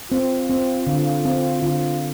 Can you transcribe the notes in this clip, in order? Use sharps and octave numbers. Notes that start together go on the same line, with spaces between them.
C4 F4
C4
D3
C4
D3 F4